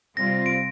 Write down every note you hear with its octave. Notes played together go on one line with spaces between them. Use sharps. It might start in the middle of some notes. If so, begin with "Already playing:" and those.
C3 G3 C4 F4 A#6
D7